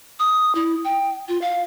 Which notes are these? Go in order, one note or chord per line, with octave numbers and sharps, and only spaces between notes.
D#6
E4
G5
F4
F5